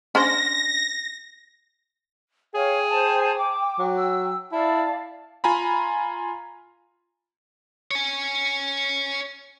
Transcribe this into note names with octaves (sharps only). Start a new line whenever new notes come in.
C#4 D4 C5 A#6
G#4 C#5 F5 G5
C5 A5
D6
F#3
E6
E4 D5 F5 A5
F4 G#5 A#5 B5
C#5 G#5